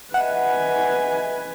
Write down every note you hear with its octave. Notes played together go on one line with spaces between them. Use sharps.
B4 D#5 E5 F#5 G#5